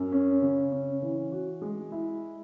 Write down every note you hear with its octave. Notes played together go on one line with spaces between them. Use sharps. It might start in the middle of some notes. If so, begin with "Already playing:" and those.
Already playing: F#2
C#4
C#3
C#4
E3
F#4
G#3
E4